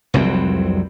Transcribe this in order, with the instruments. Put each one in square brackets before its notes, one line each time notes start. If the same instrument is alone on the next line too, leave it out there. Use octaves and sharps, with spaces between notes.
[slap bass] F1 C2 F#3 C4